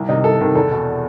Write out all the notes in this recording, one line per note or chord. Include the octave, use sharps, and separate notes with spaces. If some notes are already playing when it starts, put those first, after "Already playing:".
Already playing: C2
C3 D#3 D#4
C2 A4
C3 D#3
E2 A4
B2